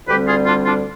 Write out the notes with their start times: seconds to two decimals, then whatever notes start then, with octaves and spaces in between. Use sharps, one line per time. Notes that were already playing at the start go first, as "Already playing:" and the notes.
0.07 D2 D3 G3 C4 G4 B4
0.27 F4 G#4
0.46 D4 F4
0.65 D4 F4